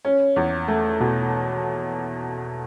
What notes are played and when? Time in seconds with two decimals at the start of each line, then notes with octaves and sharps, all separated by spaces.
0.05 C#4
0.36 E2
0.68 A3
1.00 B2